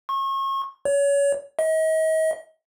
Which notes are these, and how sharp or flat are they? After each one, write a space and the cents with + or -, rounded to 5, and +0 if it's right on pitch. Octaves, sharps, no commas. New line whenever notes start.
C#6 -35
C#5 +30
D#5 +40